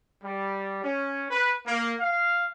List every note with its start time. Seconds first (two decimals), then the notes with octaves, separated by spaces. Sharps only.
0.24 G3
0.83 C#4
1.31 B4
1.67 A#3
2.01 F5